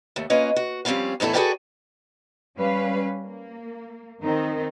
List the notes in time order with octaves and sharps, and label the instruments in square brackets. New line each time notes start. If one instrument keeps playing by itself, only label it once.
[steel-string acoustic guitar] D#2 A3
A#3 C#4 F4 B4 D#5
F#4
F3 G3 C4 C#4 F4 F5
E2 A2 D#3 E4 A4
F#4 G#4 A4 B4 D5 G5
[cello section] G3 C#4 B4 F5
A#3
D#3 C4 D#4 A#4